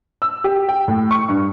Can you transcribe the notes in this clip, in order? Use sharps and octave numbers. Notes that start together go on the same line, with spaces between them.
E6
G4
G5
A2
C#6
G2